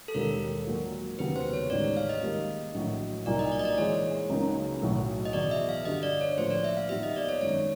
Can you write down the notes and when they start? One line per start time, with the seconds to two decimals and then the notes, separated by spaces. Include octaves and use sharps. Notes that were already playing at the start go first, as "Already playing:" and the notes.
0.08 A4
0.14 E1 D#2 D#3 G3 A#4
0.67 A#2 F#3 A#3 D4 F4
1.19 F1 D#2 C#3 F#3 B3 B4
1.36 C5
1.53 C#5
1.70 A1 G#2 D#3 G3 D5
1.84 C#5
1.97 F5
2.09 D#5
2.22 G#2 D#3 G3 A#3
2.74 A#1 A2 F#3
3.26 C2 A#2 F#3 A#3 D#4 D5
3.39 D#5
3.52 D5
3.59 D#5
3.65 D5
3.78 G#2 E3 G#3 C#5
4.30 C#2 C#3 F#3 A#3 D#4
4.82 B1 A2 F#3
5.25 D#5
5.33 E2 B2 F#3 D5
5.51 E5
5.69 F5
5.85 G2 D3 G3 D#5
6.03 D5
6.21 C#5
6.37 A2 F3 A#3 D4 F4 C5
6.50 D5
6.64 E5
6.77 F5
6.89 A#2 G3 B3 D#4 G4 E5
7.03 D#5
7.16 D5
7.29 C#5
7.41 G#1 F#2 D#3 C#5